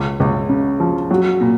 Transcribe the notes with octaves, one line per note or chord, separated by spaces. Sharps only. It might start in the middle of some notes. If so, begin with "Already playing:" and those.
Already playing: C#2
C#2
C#3
F3
F#3
A#2